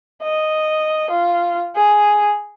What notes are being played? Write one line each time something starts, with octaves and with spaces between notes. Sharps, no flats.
D#5
F4
G#4